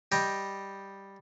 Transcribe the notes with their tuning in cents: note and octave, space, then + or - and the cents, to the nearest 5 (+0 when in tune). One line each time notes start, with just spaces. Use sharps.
G3 +0 D#5 +0 G5 +0